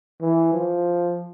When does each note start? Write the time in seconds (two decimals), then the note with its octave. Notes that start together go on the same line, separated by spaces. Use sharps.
0.21 E3
0.53 F3